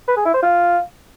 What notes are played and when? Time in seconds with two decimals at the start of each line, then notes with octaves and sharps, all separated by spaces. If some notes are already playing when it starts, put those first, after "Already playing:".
0.08 B4
0.17 G#4
0.25 E4
0.34 C5
0.43 F4